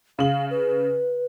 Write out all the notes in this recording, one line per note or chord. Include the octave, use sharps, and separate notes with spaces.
C#3 F5 F#7
B4